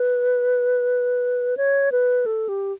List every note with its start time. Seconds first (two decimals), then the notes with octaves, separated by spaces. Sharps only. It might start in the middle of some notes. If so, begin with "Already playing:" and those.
Already playing: B4
1.57 C#5
1.92 B4
2.26 A4
2.49 G4